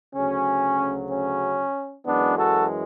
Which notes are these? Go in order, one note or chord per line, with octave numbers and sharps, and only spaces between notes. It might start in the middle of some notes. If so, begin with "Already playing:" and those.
D2 C#3 F#3 C#4
C#4
F#2 E3 G#3 B3 D4
F#4 A4